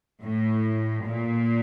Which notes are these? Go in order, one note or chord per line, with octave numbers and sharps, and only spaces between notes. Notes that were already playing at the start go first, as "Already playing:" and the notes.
A2
A#2